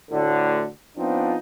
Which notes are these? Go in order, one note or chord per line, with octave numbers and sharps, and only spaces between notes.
D2 A2 D3
F3 B3 C4 D4 D#4 F4